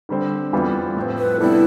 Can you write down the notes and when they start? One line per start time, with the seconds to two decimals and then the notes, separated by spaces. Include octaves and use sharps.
0.09 D3 G3 C4
0.52 F2 E3 G3 B3 F4
0.97 A2 F3 C4
1.18 B4
1.40 C3 G3 B3 D4 E4 A4